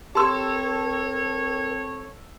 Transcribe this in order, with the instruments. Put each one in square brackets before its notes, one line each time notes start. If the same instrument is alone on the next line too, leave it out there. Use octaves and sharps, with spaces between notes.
[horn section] C4 A4 C#5 [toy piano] G4 C6 [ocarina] A#4 [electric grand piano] A5 E6